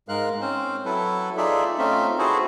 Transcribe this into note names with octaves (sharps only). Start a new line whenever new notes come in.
G#2 G#3 A#4 F5 F#6
C4 C#4 C5
F#3 E4 A4 B4
D#4 F4 G#4 A4 D5 E5
A3 C4 C#4 D#4 F4 E5
E4 F#4 G#4 A4 B4 C5